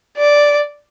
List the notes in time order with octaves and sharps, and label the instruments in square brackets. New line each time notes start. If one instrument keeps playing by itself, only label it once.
[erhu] D5